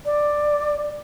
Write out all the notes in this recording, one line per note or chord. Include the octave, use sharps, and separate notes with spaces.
D5